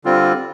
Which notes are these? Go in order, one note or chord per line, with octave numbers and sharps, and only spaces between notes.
D3 G3 C4 F4